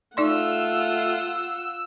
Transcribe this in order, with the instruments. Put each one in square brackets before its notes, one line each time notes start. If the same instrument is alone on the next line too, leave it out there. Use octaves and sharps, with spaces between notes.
[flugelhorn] A3 [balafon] D#4 D5 C6 [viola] F4 F#5 [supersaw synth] E6